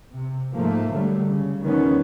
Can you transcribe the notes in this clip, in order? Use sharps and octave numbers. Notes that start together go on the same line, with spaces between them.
C3
G#2 F3 A3 A#3
D3 F#3 G3 A3
C#3
E2 D#3 G3 B3 C#4